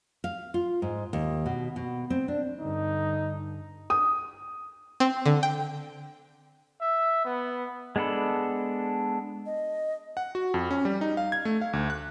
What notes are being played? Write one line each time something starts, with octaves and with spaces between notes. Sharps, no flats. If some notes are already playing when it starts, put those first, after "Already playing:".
F5
F4
G#2
D#2
B2
B2
C4
D4
G2 D3 D#4
D#6
C4
D3
G5
E5
B3
G#3 B3 D4 A4 B5
D#5
F#5
F#4
F2
C#4
G3
D#4
F5
G#6
A3
F5
D2
F#6